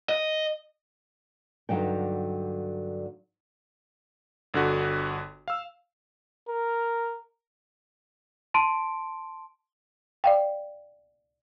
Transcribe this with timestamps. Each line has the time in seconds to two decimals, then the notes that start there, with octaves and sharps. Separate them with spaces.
0.09 D#5
1.69 G2 D3 F#3 D#4 G5
4.54 G1 D3 F#4
5.48 F5 E6
6.48 A#4
8.54 A5 C6 D7
10.24 D5 F5 G5